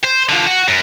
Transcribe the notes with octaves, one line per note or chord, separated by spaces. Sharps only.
C5
D3 F3
F#4
F#2